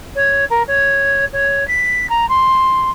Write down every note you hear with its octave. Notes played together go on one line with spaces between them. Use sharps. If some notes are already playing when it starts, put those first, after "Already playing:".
C#5
A#4
C#5
C#5
B6
A#5
C6